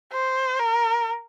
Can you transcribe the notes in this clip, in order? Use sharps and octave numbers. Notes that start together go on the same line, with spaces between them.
C5
A#4